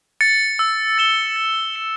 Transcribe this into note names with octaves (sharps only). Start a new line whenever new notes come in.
A6 C#7
E6
A6 E7 G7
A6
C#7 G7